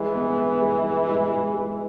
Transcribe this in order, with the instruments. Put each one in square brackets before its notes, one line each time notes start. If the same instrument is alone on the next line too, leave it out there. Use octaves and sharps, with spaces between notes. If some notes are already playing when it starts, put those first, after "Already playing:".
Already playing: [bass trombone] E3 [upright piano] G#3
[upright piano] B3
B3
G#3
G#3
G#3
G#3
G#3